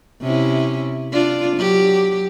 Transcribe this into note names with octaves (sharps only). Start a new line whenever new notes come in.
C3 C#4 E4
D4 F4
F#3 G4